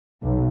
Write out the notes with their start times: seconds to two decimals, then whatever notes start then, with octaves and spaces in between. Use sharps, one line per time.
0.22 B1